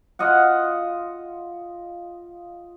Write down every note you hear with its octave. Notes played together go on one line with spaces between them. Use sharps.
F4 D#5 F5 F#5